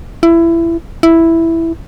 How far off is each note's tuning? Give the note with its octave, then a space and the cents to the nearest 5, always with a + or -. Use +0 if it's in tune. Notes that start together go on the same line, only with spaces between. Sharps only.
E4 +20
E4 +0